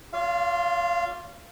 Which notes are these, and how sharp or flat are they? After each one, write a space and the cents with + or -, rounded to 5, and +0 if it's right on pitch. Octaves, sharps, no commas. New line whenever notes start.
F4 +15 C#5 +45 F5 -25